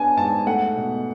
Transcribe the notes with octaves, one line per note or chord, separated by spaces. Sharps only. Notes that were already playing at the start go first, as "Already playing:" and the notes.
Already playing: B3 D4 G#5 A5
G#2 A5
A3 F#5
B2